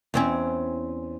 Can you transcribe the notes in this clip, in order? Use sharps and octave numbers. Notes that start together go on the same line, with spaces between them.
E2 C4 C#4